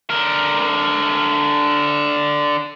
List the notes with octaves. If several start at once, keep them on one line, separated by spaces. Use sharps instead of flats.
D3 A#4